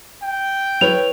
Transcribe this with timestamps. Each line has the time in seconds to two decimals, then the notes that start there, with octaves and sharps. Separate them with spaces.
0.23 G5
0.81 E4 B4 C#5 F7